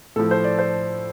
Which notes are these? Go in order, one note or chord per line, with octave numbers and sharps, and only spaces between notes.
A2 F3 A4
C5
D5
C5